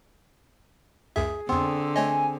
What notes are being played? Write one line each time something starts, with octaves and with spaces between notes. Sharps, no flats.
C#2 F#2 G#4 E5
F2 D3 B3 C4 G#4
A3 C#5 D#5 G#5